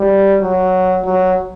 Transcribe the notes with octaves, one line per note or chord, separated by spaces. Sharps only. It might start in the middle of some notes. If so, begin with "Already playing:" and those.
Already playing: G3
F#3
F#3